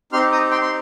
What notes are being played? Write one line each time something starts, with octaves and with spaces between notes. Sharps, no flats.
C4 D#4 G4 C6 F6
A#5 D#6
G5 C6
C6